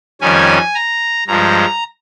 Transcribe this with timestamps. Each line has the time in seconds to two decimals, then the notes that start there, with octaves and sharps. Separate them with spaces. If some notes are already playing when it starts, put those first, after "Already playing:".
0.21 F2 D#3 G3 C#4 G#5
0.75 A#5
1.27 G2 F3 G#3 A#5